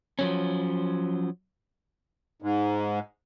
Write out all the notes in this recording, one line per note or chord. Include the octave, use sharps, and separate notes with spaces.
F3 F#3 C#4
G#2